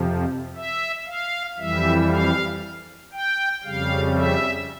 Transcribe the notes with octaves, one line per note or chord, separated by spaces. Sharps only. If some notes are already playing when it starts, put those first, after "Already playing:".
Already playing: F2 C3 F3
E5
F5
F2 E3 G3 E5
F5
G5
F2 C#3 G3 F5
E5